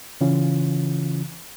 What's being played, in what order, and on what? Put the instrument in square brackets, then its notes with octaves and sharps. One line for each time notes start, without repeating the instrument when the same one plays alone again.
[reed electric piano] C#3 E3 C#4 F4